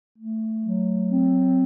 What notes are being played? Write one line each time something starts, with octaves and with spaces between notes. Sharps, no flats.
A3
F#3
C4